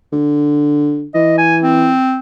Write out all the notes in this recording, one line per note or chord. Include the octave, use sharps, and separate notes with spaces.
D3
E3 D#5
G#5
C4